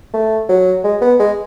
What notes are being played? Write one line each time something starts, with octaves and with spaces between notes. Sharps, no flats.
A3
F#3
G#3
B3
G#3